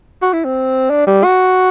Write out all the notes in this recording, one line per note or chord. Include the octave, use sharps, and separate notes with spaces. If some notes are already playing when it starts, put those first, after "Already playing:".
F#4
E4
C4
D4
G3
F#4